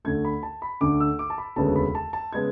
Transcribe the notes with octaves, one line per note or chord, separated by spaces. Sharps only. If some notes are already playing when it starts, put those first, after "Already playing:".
D2 D3 A3 G#6
B5
A5
B5
D2 D3 A3 D6
E6
D6
A5
B5
E1 D2 C#3 G#3 B3 A5
B5
A5
A5
C#3 G#3 B3 G#6